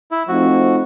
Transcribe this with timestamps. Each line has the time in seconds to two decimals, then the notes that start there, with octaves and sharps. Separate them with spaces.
0.11 E4
0.28 F3 A3 C4 D#4 F#4